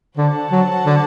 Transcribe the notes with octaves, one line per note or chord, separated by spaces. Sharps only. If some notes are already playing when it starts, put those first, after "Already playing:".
D3 F#4 A4 C5 F#5 A5
F#3
D3